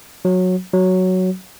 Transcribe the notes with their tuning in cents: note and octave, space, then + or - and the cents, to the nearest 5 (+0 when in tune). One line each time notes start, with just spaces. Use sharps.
F#3 -15
F#3 +0